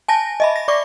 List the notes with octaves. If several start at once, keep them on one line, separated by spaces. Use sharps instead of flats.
G#5 A5 A#6
D#5 E5 B5
A#6
D5 C#6 D6